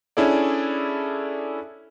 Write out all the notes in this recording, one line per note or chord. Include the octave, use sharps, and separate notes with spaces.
C#4 D4 E4 G#4 A4 D5